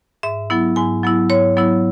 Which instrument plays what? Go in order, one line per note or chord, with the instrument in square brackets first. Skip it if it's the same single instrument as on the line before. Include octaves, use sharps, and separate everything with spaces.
[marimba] G#2 E5
F#3 B3 E4
G#2 G#5
F#3 B3 E4
G#2 C#5
F#3 B3 E4